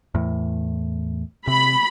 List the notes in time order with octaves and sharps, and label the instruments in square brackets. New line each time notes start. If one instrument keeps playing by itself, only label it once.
[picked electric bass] E2 A2
[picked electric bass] C3 [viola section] B5